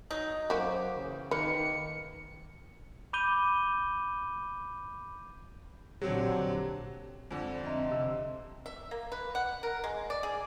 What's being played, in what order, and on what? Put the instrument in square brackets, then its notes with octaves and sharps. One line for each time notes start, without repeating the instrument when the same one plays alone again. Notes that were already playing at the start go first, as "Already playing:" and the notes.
[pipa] F#3 D#4
[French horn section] F#2 C5 [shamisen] A#3 F#4 [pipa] G4
[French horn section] C#3 E3
[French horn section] D#3 [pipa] A#3 [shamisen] B4 [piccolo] C#7
[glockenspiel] B5 D6 G6 D#7 G7
[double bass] A#1 D3 [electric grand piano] F#3 C4 C#5 [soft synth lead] G4
[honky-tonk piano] F2 D3
[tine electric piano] C4 A#5 [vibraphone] D#5 E5 C6
[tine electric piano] C3 E6
[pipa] E5
A#3
B4
F#5
A#4
G#3
D5
G#4